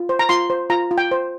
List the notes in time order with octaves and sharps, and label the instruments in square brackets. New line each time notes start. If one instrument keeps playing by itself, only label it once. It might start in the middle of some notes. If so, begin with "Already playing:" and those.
Already playing: [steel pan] F4
C5
A#5
F4 C6
C5
F4 A#5
F4
G5
C5